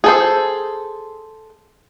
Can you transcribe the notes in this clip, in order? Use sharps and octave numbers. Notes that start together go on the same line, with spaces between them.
G#4 A4 C5